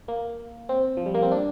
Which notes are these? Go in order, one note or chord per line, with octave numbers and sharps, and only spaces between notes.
A#3
C4
F3
G3
A#3
C4
D4